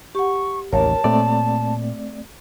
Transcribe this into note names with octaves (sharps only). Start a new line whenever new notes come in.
G4 F#5 C#6
A1 D#2 A#4 C#5 A5
A#2 A3 C4 D5